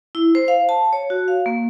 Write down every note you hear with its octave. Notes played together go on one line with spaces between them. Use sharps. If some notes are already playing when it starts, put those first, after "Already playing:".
E4
C5
F5
A5
C#5
F#4
F5
A#3